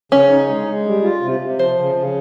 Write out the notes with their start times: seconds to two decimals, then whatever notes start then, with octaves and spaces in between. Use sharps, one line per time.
0.12 C#3 C#4
0.30 D#4
0.49 G#3
0.67 G#3
0.86 G3
1.03 F4
1.22 C3
1.40 C3
1.59 F3 C5
1.77 C#3
1.95 C#3